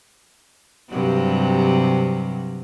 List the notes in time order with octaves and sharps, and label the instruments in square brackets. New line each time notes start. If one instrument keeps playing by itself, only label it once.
[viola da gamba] G2 C3 F#3